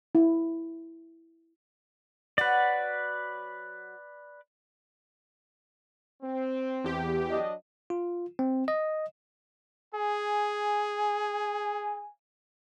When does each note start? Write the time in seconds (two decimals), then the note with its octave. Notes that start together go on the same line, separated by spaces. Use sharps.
0.15 E4
2.38 F#3 F#4 B4 D5
6.23 C4
6.84 E2 G4
7.30 F#3 D4 D#5
7.90 F4
8.39 C4
8.68 D#5
9.94 G#4 G#5